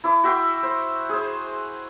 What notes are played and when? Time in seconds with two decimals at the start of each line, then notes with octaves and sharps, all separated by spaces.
0.04 E4 D6
0.24 F#4 E5 G5 C6
0.63 C5
1.09 G#4 C5